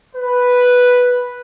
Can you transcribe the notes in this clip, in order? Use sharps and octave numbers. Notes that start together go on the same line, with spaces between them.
B4